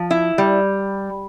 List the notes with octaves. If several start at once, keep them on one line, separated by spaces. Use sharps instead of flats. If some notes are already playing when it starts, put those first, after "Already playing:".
Already playing: F3
E4
G3